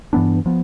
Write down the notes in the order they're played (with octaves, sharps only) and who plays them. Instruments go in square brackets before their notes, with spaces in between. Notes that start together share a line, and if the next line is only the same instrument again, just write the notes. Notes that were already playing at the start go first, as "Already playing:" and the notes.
[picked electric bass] G2 E3 B3 D4
F3 B3